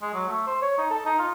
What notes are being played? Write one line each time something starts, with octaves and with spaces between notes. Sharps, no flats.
G#3
F#3
A3
C5
C#5
D#4
A4
D#4
F4